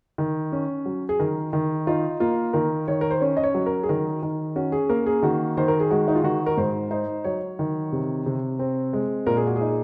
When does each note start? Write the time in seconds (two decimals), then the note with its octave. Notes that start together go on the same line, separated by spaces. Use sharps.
0.18 D#3
0.52 C#4
0.86 F#3
1.09 G#4
1.20 D#3 A#4
1.53 D#3
1.87 D#4 F4
2.20 A#3 F4
2.53 D#3 A#4
2.88 D#3 C#5
3.01 A#4
3.11 C5
3.21 C#4 C#5
3.37 D#5
3.43 C#5
3.54 F#3
3.66 A#4
3.83 G#4
3.89 D#3 A#4
4.23 D#3
4.56 C#4 F#4
4.72 G#4
4.89 A#3 A#4
5.06 G#4
5.23 D#3 F#4
5.57 D#3 C5
5.68 A#4
5.80 G#4
5.91 G#3 F#4
6.08 D#4
6.15 F4
6.23 D#3 F#4
6.46 A#4
6.57 G#2 C5
6.91 D#4 C5
7.24 F#3 C#5
7.59 D#3
7.92 C3
8.26 C3
8.59 C4
8.93 G#3
9.27 A#2 A#4
9.37 G#4
9.47 F#4
9.56 G#4
9.61 D#4